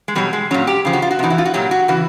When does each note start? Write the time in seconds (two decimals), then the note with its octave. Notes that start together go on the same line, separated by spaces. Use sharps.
0.08 G#3
0.15 B2 F#3 G3
0.33 G#3
0.51 A#2 F#3 C#4
0.67 G4
0.85 C#3 F3
0.93 F#4
1.02 F4
1.11 F#4
1.19 C3 E3 D#4
1.30 E4
1.38 F4
1.45 F#4
1.54 A#2 F#3 G4
1.71 F#4
1.88 C#3 E3 F#4